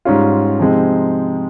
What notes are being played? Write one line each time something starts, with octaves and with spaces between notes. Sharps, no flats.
G#2 G3 C#4 F4
C3 F3 G#3 C4 D#4